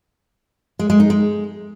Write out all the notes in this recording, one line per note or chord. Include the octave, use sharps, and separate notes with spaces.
G#3
G#3
D#4
G#3